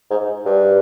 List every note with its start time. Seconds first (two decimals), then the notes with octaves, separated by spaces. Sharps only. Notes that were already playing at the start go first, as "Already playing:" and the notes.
0.10 G#2
0.45 G2